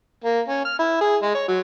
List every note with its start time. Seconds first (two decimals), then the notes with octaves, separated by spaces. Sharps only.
0.24 A#3
0.48 C#4
0.65 F6
0.79 E4
1.01 G#4
1.23 G#3
1.34 C#5
1.48 F#3